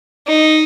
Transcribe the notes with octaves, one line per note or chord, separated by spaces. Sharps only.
D#4